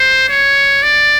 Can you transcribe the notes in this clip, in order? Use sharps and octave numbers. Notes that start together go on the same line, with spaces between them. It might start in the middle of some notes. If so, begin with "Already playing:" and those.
Already playing: C5
C#5
D5